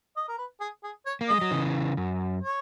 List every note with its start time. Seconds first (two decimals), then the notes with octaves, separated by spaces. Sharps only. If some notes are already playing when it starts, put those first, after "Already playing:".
0.17 D#5
0.28 A#4
0.38 B4
0.61 G#4
0.84 G#4
1.06 C#5
1.21 A#3
1.28 G#3 D#5
1.41 F#3
1.51 C#3 E3
1.97 F#2
2.42 C#5